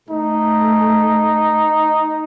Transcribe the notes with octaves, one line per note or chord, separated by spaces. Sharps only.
A3 D#4